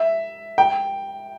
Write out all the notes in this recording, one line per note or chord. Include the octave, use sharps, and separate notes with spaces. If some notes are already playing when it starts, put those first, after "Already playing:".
Already playing: E5
G5